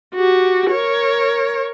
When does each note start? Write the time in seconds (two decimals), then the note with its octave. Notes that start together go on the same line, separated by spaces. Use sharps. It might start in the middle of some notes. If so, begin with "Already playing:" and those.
0.15 F#4 G4
0.71 A#4 C#5